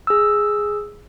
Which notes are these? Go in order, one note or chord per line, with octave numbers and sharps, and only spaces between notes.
G#4 E6